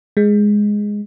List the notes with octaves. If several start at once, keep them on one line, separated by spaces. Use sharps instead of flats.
G#3